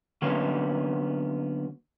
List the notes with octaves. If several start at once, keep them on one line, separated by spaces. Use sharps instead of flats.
D3 F#3 A#3 B3 C#4